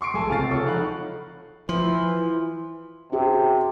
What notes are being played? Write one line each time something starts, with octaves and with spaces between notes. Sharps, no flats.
C6 C#6 C7 D7
B1 G#3 A4 G#5 A5
C#2 C3 F5 F6 A6 C7
A4 C#5 C#6
F3 D#4 A4 F#5 B5 F#6
E3 F3 E4 C6
C3 C#4 F#4 G#4